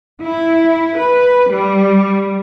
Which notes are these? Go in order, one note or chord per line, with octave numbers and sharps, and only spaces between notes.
E4
B4
G3